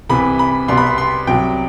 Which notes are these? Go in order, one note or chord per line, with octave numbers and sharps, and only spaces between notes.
C2 C3 E3 B5
B5
C2 B2 G3 C6
B5
C6
C6
C2 C3 F#3 G5